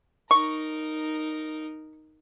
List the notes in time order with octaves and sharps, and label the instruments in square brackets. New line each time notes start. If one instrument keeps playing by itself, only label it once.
[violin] D#4 A#4 [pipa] C#6